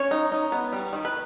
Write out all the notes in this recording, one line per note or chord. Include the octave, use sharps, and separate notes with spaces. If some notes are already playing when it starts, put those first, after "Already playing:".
Already playing: C#4 C#5
D#4
D#4
B3
G3
D#3
B4